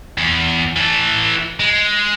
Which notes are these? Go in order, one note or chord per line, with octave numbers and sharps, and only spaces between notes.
E2
E3 A4
G#3